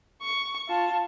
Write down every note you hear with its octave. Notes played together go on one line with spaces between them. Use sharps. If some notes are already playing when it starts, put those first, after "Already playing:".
C#6
F4 A5